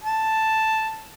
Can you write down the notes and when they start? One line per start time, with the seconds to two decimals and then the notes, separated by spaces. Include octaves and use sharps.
0.04 A5